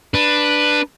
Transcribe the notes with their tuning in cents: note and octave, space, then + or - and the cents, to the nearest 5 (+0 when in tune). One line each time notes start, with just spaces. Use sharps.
D4 +10 B4 +0